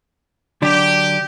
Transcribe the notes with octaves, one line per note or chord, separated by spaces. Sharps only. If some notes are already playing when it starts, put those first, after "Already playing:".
D3 F#3 D4 G4